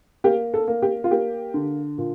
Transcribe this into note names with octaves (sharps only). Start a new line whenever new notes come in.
A#3 G4
A4
A#3
G4
F4
A#3 G4
D3
A#2